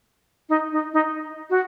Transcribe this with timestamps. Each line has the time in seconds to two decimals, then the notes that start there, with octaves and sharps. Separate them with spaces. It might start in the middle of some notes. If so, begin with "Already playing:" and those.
0.49 D#4
0.72 D#4
0.94 D#4
1.50 F#4